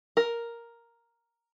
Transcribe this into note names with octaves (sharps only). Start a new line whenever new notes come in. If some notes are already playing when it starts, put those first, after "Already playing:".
A#4